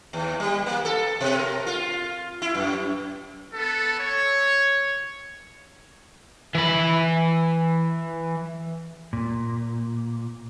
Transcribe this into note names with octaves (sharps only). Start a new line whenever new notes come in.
D#2
G3
A#3
A4
B2
A#4
F4
E4
F#2
B3 A4
C#5
E3 B5
A#2